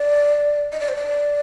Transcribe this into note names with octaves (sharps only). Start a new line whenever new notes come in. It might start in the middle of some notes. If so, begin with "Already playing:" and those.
Already playing: D5
D#5
D5
C5
D5